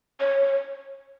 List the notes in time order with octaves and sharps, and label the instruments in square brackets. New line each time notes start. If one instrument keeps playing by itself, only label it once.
[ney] C#5